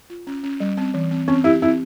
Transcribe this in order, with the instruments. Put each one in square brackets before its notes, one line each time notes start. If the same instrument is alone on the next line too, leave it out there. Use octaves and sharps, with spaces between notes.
[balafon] F4
C#4
C#4
G3
C4
E3
C4
[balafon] C4 [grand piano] C#4
[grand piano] E4 [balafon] G4
[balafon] C4 [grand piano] E4